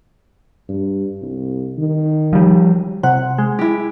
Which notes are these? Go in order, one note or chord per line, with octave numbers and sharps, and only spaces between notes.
G2
C2
D#3
F3 G3
C3 F#5
G#3
E4 G4